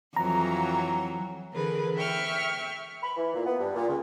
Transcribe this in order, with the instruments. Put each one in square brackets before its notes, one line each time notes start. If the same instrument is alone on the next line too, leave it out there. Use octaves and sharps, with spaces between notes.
[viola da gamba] F2 E3 F#3 [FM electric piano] A#5
[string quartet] D3 E3 G#4 A#4 B4
E5 G5 C#6 F6
[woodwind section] B5
E3
A#2
B3
G2
A#2
C#2